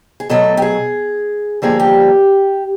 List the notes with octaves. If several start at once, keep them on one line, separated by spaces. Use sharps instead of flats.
G#4
B2 F#3 A3 A4
G4
G#4
G2 D3 F3 A#3 G#4
G4